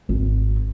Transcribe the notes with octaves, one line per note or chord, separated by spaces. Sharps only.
G#1